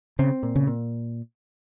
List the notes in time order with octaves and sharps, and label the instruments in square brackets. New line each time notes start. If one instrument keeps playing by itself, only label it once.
[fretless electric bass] C#3 [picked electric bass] C4
[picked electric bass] A#2
[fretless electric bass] C#3
[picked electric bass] A#2